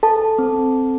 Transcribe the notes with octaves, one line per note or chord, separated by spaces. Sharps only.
A4 A5
C4